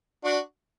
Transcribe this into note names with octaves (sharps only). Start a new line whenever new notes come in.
D4 F#4